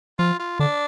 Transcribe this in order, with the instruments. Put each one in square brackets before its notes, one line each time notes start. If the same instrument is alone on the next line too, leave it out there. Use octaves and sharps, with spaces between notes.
[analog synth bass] F3 [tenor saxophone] F4
[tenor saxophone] F4
[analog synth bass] D3 [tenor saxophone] D4